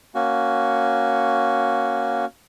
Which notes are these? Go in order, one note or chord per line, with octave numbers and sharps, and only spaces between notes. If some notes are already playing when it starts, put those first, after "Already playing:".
A#3 C#4 F#4